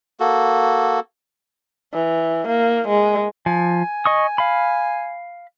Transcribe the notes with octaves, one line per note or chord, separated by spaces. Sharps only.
A#3 F#4 A4
E3
A#3
G#3
F3 G#5
D#5 C#6 D#6
F5 B5